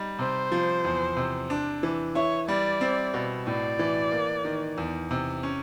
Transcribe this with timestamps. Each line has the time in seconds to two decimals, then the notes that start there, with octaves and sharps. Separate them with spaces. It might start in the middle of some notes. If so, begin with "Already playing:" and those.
Already playing: G3 D#4
0.19 C3 C5
0.52 F3
0.85 E2
1.17 C3
1.50 D4
1.83 E3
2.15 E4 C#5
2.48 G3 D5
2.81 C4
3.14 B2
3.46 A2 D5
3.79 E3
4.12 A#3
4.45 D#3
4.78 E2
5.11 C3
5.43 C#4